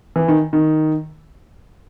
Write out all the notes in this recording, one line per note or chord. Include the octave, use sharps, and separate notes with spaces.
E3
D#3
D#3